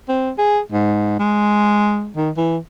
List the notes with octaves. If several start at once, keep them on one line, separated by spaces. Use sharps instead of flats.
C4
G#4
G#2
G#3
D#3
E3